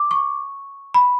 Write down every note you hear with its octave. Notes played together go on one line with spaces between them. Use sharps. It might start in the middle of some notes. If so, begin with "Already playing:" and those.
Already playing: D6
C#6
B5